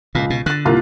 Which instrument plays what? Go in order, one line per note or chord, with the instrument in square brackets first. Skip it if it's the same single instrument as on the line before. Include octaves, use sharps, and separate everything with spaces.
[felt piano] C#2 [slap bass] A#2
[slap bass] B2
[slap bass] D3 [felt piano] F#6 A6
[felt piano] C2 A#3 F4